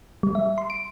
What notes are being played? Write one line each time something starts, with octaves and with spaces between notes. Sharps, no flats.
G3
E5
C6
D7